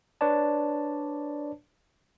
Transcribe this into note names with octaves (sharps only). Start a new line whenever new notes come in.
D4 B4 C#5 D5 A5